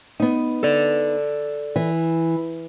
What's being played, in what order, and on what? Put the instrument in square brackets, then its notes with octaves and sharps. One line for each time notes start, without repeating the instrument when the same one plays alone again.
[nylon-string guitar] B3 D#4
[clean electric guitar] A4 D5
[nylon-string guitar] E3